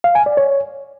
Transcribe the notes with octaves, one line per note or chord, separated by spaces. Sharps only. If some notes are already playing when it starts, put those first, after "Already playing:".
F5
G#5
D5
C#5